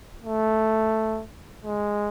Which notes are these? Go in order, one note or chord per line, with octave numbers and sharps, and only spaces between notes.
A3
G#3